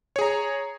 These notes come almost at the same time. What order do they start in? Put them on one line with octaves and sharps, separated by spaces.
C#5 G#4 A#5